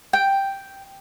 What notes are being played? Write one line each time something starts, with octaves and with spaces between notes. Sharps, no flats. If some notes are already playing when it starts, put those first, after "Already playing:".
G5